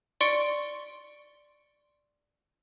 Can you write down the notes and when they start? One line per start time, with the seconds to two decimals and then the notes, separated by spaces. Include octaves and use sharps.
0.21 D5 C6 C#6 C#7 D7